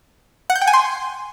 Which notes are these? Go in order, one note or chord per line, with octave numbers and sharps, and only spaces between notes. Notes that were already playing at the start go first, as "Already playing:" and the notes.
F#5
G6
G5
G#5
C6